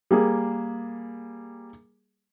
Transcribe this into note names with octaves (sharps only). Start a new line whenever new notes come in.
G3 A#3 G#4